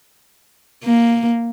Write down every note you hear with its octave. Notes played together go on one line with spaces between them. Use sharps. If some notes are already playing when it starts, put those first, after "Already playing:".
A#3